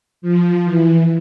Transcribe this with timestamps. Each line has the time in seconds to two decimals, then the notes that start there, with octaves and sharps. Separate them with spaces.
0.22 F3
0.65 E3